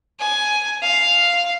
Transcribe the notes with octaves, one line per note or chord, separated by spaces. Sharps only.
G#5
F5